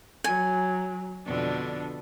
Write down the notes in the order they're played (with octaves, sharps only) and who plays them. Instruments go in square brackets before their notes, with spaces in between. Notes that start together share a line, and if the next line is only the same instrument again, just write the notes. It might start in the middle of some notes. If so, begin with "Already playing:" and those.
[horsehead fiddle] F#3 [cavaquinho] G#5
[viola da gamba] F2 B2 D3 [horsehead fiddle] D4